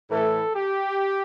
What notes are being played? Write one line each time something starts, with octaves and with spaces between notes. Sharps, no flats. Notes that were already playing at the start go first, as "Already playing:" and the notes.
A2 E3 A4
G4